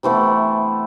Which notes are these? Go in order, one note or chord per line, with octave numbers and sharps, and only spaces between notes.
C3 E3 A3 B3